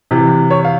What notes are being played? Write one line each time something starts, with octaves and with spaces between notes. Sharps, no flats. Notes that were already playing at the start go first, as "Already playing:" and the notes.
C3 E3
C#5
F5